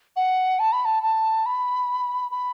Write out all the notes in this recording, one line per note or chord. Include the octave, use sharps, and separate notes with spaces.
F#5
A5
B5
A5
A5
B5
B5